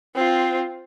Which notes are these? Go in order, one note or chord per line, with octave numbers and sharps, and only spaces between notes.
C4 F4